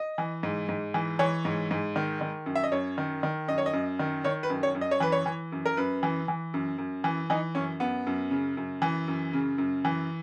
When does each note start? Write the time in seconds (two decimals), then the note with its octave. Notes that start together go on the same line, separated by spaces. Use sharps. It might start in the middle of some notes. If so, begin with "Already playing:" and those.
Already playing: D#5
0.18 E3
0.43 G#2
0.69 G#2
0.94 E3
1.19 E3 C#5
1.45 G#2
1.71 G#2
1.96 D#3
2.21 D#3
2.46 F#2
2.55 E5
2.64 D#5
2.72 F#2 C#5
2.98 D#3
3.23 D#3
3.48 F#2 D#5
3.58 C#5
3.66 D#5
3.73 F#2
3.99 D#3
4.24 D#3 C#5
4.43 B4
4.50 F#2
4.63 C#5
4.75 F#2
4.81 D#5
4.91 C#5
5.00 E3 B4
5.12 C#5
5.26 E3
5.52 F#2
5.66 A#4
5.77 F#2 B4
6.03 E3
6.28 E3
6.54 F#2
6.78 F#2
7.04 E3
7.30 E3 D#4
7.55 F#2 C#4
7.80 F#2 B3
8.07 F#2
8.31 C#3
8.57 F#2
8.82 E3
9.08 F#2
9.33 C#3
9.58 F#2
9.85 E3